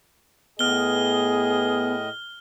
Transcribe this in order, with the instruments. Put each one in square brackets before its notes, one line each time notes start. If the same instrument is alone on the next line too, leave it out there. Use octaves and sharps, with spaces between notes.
[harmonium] A2 D#5 [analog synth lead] B3 [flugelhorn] G#4 [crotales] F6 G7